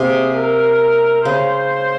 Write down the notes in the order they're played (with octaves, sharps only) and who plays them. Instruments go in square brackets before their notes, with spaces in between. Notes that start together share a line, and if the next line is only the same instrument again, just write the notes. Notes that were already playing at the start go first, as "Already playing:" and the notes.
Already playing: [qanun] C3 A#3 [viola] G#4
[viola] A#4
[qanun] C#3 [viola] C5